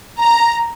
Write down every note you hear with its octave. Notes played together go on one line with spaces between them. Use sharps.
A#5